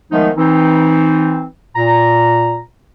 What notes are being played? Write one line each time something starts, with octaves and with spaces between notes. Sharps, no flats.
D#3 F3 G#3 A3 B3 D#4
E3 C4 D#4
A#2 A#5